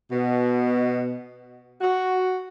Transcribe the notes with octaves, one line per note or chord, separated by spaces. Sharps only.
B2
F#4